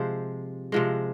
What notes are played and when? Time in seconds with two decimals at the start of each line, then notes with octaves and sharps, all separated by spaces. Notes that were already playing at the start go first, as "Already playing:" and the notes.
Already playing: C3 F3 G#3 C5
0.72 C3 F3 G#3